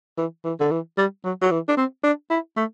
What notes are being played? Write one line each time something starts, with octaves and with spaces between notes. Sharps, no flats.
E3
E3
D3
E3
G3
F#3
F#3
E3
D4
C4
D4
E4
A3